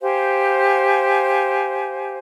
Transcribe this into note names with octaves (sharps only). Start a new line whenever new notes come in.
G4 C5 F5 G#5